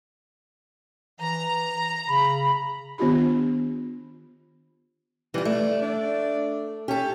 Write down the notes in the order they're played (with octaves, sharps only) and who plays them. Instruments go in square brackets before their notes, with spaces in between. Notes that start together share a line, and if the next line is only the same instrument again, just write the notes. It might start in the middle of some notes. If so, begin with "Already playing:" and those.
[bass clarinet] E3 [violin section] A#5
[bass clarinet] C#3 [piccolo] B5
[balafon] D#3 B3 D4 F4 G4 B5
[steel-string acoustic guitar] E3 F4 [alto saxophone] G3
[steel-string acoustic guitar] A3 [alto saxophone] D5
[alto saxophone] D4
[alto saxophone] C#4 [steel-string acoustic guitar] G4 A4